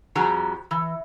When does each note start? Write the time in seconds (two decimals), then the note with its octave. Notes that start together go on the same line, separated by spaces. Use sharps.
0.15 F2 F3 G3 F#4 G#4 A#5
0.71 E3